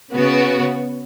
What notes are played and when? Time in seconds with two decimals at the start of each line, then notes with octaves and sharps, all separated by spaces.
0.12 C#3 B3 F#4